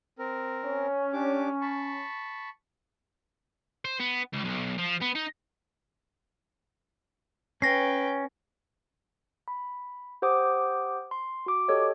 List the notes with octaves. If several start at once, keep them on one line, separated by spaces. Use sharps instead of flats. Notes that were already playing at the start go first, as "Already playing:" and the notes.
C4 A#4
C#4
D4 G4 D6
A5 B5 C#6
C5
B3
C#2
B1
F3
B3
D#4
C#4 B4 G5 A#6 C7
B5
G4 C5 F#5 D6 D#6
C6
F#4 D6
G4 A4 C#5 D#5